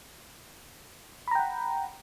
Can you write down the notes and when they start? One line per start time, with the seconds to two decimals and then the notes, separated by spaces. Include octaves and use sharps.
1.28 B5
1.31 A#5
1.35 G5
1.39 F#5